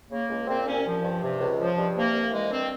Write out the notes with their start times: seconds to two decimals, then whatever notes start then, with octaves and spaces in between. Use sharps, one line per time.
0.10 C#3 A#3
0.29 C#2
0.47 A#2 C4
0.66 C2 C#4
0.85 F3
1.03 G2
1.21 C3
1.39 C#2
1.59 F3
1.77 G2
1.95 C3 A#3
2.13 C2
2.32 E3 G#3
2.50 G2 C4